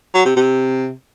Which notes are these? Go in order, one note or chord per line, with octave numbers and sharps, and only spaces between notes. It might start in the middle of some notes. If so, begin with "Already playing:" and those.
F#3
C3
C3